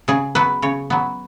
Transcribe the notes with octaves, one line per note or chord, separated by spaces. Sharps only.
C#3 G#4
F#3 B3 B4
C#3 C#5
F#3 B3